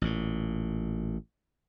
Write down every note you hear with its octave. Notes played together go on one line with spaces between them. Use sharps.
A1 A#2